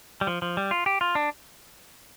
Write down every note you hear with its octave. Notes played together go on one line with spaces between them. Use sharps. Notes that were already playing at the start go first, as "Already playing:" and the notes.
G3
F3
F3
G3
F4
G4
F4
D4